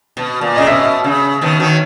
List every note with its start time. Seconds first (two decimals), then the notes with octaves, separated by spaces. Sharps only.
0.17 B2
0.41 A#2
0.56 C#3 D#5
0.67 B2 E5
1.04 C#3
1.41 B2 D#3
1.60 D#3 F#3